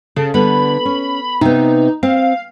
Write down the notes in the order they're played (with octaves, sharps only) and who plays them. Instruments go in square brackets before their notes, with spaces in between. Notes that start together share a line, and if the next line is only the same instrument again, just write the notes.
[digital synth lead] C#3 [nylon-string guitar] A4
[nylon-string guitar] D3 G3 B3 [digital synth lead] B5
[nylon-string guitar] C#4
[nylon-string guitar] C3 B3 [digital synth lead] D#4
[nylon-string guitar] C4 [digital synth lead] F5